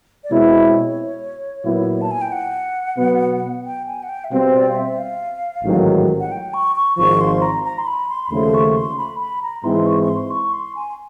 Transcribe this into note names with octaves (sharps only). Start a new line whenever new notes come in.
D5
B2 G#3 C4 E4 C#5
A#2 F#3 B3 E4
A5
G#5
G5
F#5
B2 F#3 B3
G5
G#5
F#5
G5
E5
B2 G3 C4 F5
D5
F5
E5
F5
A1 G#2 D#3 F#3
F#5
G5
C#6
C#6
G#1 G#2 F3 C#6
C6
A#5
A#5
C6
B5
C6
B5
D#2 C#3 F3 A3 C6
C#6
C6
B5
B5
A#5
G#2 E3 G#3 C4 E4 C6
C#6
C#6
C6
C#6
C6
G#5